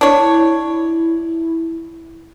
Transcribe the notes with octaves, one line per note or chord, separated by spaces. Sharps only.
D4 E4 C#5